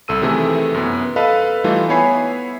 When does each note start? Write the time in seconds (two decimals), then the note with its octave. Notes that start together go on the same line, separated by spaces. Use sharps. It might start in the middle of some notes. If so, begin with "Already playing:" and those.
0.08 C2 A4 E6 D#7
0.22 C3 D#3 E3 A3 G#4
0.74 F#2 B3
1.16 A4 B4 D#5 F5 B5
1.64 E3 G3 A3 D#4 F4
1.89 B3 E4 C#5 G#5 B5 C7